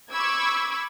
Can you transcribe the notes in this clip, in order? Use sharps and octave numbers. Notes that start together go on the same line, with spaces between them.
B5 C#6 D6 E6 G#6